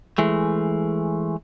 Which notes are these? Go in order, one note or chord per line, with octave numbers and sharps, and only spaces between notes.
E3 G#3 A3